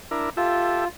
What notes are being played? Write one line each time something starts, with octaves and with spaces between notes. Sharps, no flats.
D4 E4 A#4
F4 G4 A4 E5